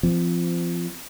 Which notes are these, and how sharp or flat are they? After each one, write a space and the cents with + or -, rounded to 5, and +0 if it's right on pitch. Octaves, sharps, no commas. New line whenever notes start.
F3 -20 C4 -25